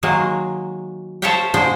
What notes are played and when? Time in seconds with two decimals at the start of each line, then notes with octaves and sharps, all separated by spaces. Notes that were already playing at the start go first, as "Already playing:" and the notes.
0.03 D#3 F#3 G#3 A#3
1.22 A4 C5 C#5 E5 F5 G5
1.54 A#2 D3 G#3 C5 G5